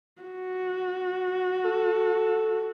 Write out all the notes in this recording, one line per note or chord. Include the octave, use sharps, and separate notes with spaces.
F#4
A4